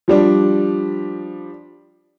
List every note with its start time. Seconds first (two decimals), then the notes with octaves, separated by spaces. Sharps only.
0.08 F3 G3 D4